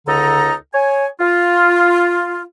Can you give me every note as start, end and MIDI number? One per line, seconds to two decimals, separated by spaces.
0.07 0.53 37
0.07 0.53 50
0.07 0.53 63
0.07 0.53 69
0.07 0.53 82
0.74 1.06 73
0.74 1.06 80
1.19 2.42 65